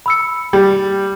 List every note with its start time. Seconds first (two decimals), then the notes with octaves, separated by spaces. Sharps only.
0.06 B5 E6 C#7
0.53 G3 G5